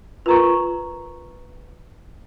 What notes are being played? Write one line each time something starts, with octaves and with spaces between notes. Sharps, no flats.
F4 A#4 B4 A#5 C#6